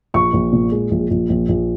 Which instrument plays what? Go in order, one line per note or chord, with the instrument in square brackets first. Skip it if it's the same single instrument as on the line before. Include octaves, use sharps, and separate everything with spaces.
[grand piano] A#1 C#6
A#1
A#2
G#3
A#1
A#1
A#1
A#1